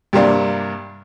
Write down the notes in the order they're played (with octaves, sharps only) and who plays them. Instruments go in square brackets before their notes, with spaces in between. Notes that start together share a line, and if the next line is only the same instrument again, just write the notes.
[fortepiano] G2 C3 A#3 D4